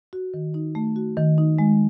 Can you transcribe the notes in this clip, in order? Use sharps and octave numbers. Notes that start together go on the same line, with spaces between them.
F#4
D#3
D#4
A3
F#4
D#3
D#4
G#3